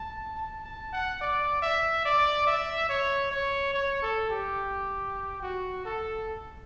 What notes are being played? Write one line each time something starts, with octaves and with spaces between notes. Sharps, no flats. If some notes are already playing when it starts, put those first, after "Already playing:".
Already playing: A5
A5
A5
F#5
D5
E5
D5
E5
C#5
C#5
C#5
A4
G4
F#4
A4